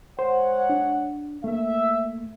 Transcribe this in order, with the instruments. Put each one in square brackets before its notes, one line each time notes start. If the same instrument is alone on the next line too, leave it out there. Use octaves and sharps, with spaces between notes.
[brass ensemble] G#3 C#5 F#5 [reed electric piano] C5
[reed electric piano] D4
[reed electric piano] A3 A#3 [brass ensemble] E5